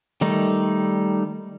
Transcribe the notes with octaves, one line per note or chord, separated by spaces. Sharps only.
D#3 G3 A3 D#4